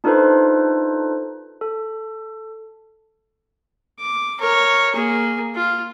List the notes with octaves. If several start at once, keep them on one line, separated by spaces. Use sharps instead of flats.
D4 D#4 F4 A4 B4 C5
A4
D6
A#4 C#5
A#3 G#4
F4